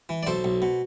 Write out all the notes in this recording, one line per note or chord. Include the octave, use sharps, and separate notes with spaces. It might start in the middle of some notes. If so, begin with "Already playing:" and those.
E3
D5
B1 A4 C5
B1
B2